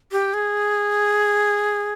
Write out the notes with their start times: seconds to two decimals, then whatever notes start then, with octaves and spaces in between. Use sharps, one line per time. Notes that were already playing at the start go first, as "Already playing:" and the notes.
0.12 G4
0.34 G#4